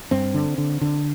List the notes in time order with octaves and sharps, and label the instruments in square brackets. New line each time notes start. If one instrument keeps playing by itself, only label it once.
[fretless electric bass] G2 C4
D3
D3
D3